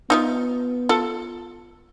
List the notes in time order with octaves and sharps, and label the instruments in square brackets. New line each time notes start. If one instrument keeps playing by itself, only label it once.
[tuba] B3 [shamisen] D#4 F4 E5
[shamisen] F4 A4